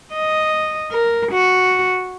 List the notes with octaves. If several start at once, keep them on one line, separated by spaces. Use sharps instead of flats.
D#5
A#4
F#4